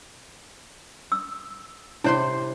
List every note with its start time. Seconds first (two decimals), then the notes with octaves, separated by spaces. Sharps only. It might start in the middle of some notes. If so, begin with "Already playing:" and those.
1.12 E6
2.04 C3 E4 C5 C#5 C6